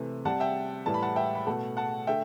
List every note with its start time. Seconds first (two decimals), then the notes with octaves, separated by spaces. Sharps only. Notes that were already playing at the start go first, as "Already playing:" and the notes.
Already playing: C3 E3 A3
0.25 C3 G3 F#5 A5
0.40 E5 G5
0.86 A2 E3 G3 A5
0.94 B5
1.03 F#5 A5
1.16 E5 G5
1.35 B5
1.47 B2 A3 F#5 A5
1.77 F#5 A5
2.07 D3 A3 E5 G5